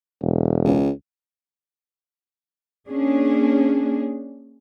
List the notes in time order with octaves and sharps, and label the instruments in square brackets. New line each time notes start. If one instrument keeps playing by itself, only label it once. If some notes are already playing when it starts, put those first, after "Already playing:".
[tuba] E1
[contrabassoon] C#2
[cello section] A#3 C#4 D4 G#4